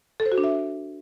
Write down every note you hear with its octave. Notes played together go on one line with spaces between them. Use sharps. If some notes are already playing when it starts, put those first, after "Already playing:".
A4
C5
F#4
D4
E5